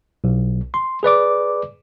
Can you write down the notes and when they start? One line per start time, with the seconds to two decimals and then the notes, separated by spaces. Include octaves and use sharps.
0.24 B1
0.74 C6
1.03 G#4 B4 D5 D6